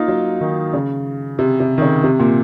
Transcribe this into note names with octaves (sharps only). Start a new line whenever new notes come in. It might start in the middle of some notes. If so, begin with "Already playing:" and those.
Already playing: A#3 D#4 F4
F#3
D#3
C#3
C3
C3
D#3
C#3
C3
A#2